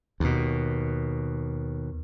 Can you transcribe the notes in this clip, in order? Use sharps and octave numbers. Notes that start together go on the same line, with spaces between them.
D#2 B2